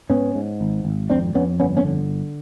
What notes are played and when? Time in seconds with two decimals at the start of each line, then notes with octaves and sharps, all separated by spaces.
0.09 G#2 B3 C#4
0.35 G#2
0.61 G#1
0.85 G#1
1.10 F2 C4 D4
1.34 F2 B3 C#4
1.60 G1 B3 C#4
1.77 B3 C#4
1.85 D3